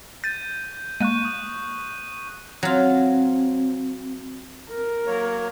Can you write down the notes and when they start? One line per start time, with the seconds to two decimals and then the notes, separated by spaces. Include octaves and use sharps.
0.24 G6 A6 D#7
1.00 G#3 A#3 C#6 F#6 D#7
1.25 D#6
2.63 F#3 C4 F4
4.71 A#4
5.07 F#3 A#3 C#5